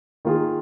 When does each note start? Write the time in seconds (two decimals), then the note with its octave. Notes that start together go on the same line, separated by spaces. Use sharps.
0.25 D#3 A#3 F4 G#4